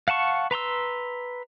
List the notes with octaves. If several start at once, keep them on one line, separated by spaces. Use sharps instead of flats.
F5 F#5 A5 C#6
B4 A#5 C6 E6